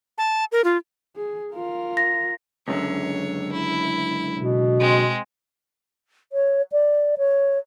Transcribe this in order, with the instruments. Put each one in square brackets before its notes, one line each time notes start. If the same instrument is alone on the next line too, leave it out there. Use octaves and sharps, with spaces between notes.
[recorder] A5
A#4
F4
[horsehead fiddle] G#4
F4 A#4
[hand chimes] A#6
[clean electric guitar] C#2 F#2 D3 [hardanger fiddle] C#5
[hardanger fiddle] E4
[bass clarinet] B2
[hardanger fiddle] G#3 C4
[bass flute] C#5
D5
C#5